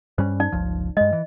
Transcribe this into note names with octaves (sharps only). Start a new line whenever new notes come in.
G2 G3 C#4 C5
D#4 D5
G1 C#2 F3
G2 G#3 D#5
E3